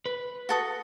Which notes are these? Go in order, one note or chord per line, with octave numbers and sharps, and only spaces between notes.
B4
F#4 A4 D#6